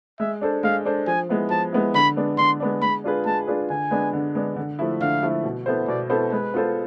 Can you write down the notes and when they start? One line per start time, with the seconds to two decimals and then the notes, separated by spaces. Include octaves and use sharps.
0.19 G#3 E5
0.41 D4 A4 C5
0.63 G#3 F5
0.85 D4 A4 C5
1.07 F3 G#5
1.29 G#3 B3 E4
1.50 F3 A5
1.73 G#3 B3 E4
1.94 D3 B5
2.16 G#3 B3 D4
2.38 D3 C6
2.60 G#3 B3 D4
2.82 G#3 B5
3.04 D4 F4 G#4 B4
3.26 G#3 A5
3.47 D4 F4 G#4 B4
3.70 D3 G#5
3.91 G#3 B3 D4
4.13 D3
4.35 G#3 B3 D4
4.56 D3
4.79 F3 A3 E4
5.01 D3 F5
5.23 F3 A3 E4
5.44 B2
5.66 B3 E4 A4 C5
5.88 B2 D5
6.10 B3 E4 A4 C5
6.32 G#3 B4
6.54 B3 F4 A4 C5